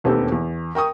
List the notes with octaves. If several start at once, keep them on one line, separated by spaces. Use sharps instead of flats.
E1 D#2 B3 C4 G4 A4
E2
A#4 G5 C#6 D#6